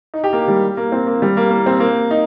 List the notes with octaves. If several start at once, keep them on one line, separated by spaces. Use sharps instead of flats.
D#4
G4
A#3
G3
A#3
C4
A#3
G3
A#3
A#3
C4
A#3
D#4